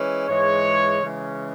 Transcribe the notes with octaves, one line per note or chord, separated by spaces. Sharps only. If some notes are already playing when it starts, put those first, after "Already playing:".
Already playing: E3 G#3 C#4
G#2 E3 G#3 C#5
C#3 E3 G#3 C#4